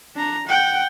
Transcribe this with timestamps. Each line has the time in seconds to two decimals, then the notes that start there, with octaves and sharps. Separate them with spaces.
0.16 D4 A#5
0.48 F#5 G5